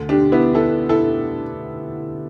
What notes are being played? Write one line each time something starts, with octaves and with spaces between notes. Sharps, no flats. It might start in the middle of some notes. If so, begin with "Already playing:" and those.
Already playing: D2 D3
D4 G4
B3 E4
E4 A4
E4 A4